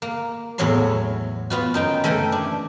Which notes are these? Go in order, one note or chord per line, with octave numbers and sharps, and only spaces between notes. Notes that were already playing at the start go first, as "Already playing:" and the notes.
A#3
E2 A2 F#3 C#5 C6
B3 F4 F#4
F#2 D#4 G5
E3 A3 A#4 G5
D4